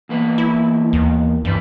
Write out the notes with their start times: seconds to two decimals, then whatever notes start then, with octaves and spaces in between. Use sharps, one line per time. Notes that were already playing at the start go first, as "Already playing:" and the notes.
0.09 E2 A#3 B4
0.38 E4
0.93 D#2
1.45 E2 G2 B4